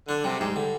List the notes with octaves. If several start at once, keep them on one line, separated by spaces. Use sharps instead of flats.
D3 D4
C3 G3
G#2 G3
D3